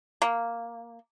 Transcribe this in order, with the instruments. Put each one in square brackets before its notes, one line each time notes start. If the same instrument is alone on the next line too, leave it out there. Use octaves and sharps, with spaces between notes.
[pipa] A#3